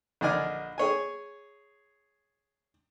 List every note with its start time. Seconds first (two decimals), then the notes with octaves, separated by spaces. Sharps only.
0.21 A#1 D3 D#4 D5 G#5 F6
0.78 G#4 C#5 G#5